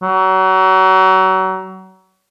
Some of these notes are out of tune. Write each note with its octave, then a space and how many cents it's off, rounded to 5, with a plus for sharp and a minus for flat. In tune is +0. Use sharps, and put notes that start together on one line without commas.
F#3 +30